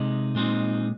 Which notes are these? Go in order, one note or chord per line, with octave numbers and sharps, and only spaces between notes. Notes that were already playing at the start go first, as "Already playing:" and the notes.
Already playing: C3 G#3 D#4
A#2 G#3 C4 D#4